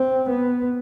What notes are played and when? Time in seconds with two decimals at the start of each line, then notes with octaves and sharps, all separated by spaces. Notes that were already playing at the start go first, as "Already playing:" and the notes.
Already playing: C4
0.30 B3